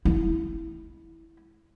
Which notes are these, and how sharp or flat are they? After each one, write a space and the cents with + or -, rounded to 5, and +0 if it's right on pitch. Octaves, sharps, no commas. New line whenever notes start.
G#3 -5 E4 -5